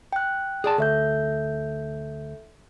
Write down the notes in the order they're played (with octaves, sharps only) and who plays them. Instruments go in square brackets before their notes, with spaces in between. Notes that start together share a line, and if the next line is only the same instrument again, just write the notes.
[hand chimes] G5 F#6
[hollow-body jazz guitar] G#4 D5 A5
[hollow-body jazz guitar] D2 [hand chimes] A4 E5 G6